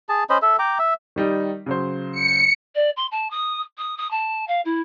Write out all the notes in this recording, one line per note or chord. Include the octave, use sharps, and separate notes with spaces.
G#4 A5
C#4 C5 D#5 B5
A4 E5
G5 A#5 D6
E5
D#3 G3 D#4
C#3 F#3 C5
C#7
D5
C6
A5
D#6
D#6
D#6
A5
F5
E4